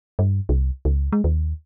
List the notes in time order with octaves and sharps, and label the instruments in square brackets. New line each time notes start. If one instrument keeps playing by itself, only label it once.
[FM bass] G2
C2
C#2
G#3
D#2